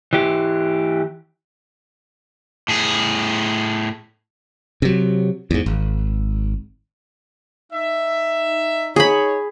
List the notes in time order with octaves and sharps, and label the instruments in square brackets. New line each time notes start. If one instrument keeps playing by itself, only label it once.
[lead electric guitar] E3 G4
[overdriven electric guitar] A2 G#4
[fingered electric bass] C3 F#3
E2 G#2
G#1
[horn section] D#4 E5
[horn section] D#4 C#5 [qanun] G#4 B5